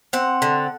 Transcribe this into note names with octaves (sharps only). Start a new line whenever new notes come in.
C4 F#5
D3